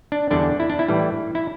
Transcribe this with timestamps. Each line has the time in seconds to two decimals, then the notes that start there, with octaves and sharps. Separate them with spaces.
0.12 D4
0.31 E2 D3 G3 D4
0.60 E4
0.70 D4
0.79 E4
0.88 A2 E3 G3
1.35 E4